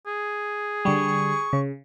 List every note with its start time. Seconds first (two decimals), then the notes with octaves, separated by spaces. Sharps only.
0.07 G#4
0.85 D3 G3 C#6
1.53 C#3